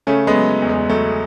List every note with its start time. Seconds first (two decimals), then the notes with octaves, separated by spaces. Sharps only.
0.07 C#3 A3 C#4
0.27 G#3 B3
0.34 F#3
0.62 E2
0.69 G#3
0.89 F#3 A3